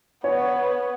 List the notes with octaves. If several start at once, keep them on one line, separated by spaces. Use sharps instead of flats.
B3 C#5